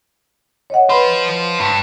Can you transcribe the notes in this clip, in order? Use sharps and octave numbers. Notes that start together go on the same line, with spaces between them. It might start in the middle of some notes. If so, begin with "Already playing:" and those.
C#5 D#5 F#5
F4 B4 C5 B5
G2